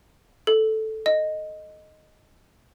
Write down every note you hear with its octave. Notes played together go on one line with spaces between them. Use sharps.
A4
D#5